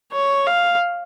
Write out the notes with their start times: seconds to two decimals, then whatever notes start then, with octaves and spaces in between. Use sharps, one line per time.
0.12 C#5
0.46 F5